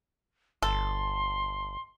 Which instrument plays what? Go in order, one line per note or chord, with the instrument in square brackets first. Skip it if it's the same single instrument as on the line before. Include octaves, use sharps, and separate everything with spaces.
[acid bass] G1 [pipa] A4 [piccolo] C6